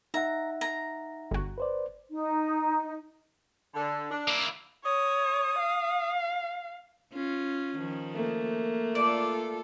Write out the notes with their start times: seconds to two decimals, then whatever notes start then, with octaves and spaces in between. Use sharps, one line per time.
0.14 D#4 E5 F#5 A#5
0.61 A#5
1.31 G1 F#4
1.58 B4 C5 D5
2.11 D#4
3.74 D3
4.10 D4
4.28 A#3 E4
4.85 C#5 D#6
5.59 F5
7.13 C#4 F4
7.76 D#3 F3
8.15 A3 A#3
8.95 F4 A4 D5